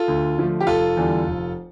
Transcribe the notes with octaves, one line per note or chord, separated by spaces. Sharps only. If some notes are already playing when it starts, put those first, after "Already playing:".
Already playing: F4 A4
D2
D3 F3 A3
G4
F1 F4 A4
E2 D3 G3
F1